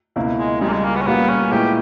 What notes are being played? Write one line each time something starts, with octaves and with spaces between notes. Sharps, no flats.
C#2 B2 A#3 C#4 E4
G#3
C#2 C#3 G3 G#3
A#3
G#3
A#3
B3
C#4
A#2 G3 A#3 B3
C#4
A#2 G#3 B3 E4 G4